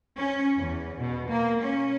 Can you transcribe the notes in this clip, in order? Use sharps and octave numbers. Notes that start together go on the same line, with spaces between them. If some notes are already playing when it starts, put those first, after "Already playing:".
C#4
E2
B2
A#3
C#4